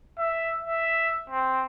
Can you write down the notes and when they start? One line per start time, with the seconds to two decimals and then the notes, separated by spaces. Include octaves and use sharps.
0.18 E5
0.64 E5
1.30 C4